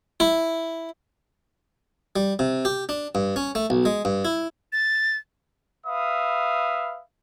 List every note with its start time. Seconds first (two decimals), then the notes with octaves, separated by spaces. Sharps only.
0.20 E4
2.16 G3
2.39 C3
2.65 G4
2.89 D4
3.15 G2
3.36 C#4
3.55 A3
3.70 B1
3.85 G#3
4.05 G2
4.25 E4
4.73 A6
5.86 B4 E5 F5 B5 D#6